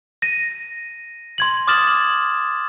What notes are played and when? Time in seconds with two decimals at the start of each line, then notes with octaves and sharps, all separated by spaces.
0.22 A#6 D#7
1.38 C6 G#6 F#7
1.68 D6 D#6 F6 A6 E7 F#7